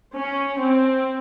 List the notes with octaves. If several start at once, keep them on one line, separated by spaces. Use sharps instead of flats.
C#4
C4